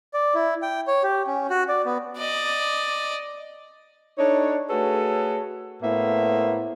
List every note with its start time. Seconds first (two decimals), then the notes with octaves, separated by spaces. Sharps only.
0.14 D5
0.34 E4
0.62 G5
0.87 C#5
1.03 G4
1.27 C#4
1.50 F#4
1.69 D5
1.85 B3
2.18 D5 D#5
4.18 D4 D#4 A4 C#5
4.69 A3 F#4 G#4 A4 B4 C#5
5.81 A2 A#3 B3 C5 E5